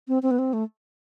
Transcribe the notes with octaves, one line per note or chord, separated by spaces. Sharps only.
C4
C4
B3
C4
A3